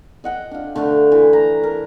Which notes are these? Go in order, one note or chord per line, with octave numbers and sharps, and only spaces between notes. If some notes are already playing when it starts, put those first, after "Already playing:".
D#5 F#5 G5
D4 F4
D3 A3 D4 F4
E3
A#5
A#4